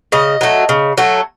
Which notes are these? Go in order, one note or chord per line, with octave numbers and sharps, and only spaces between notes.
C#3 D#5
F#3 A3
C#3
F#3 A3